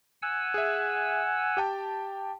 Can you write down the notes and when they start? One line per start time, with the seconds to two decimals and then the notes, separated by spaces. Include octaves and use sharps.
0.22 F#5 G#5 E6
0.54 G#4 E5
1.57 G4 G5 A5